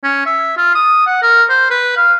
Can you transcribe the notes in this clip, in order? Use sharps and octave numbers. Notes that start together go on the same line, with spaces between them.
C#4
E5
F4
D#6
F#5
A#4
C5
B4
F5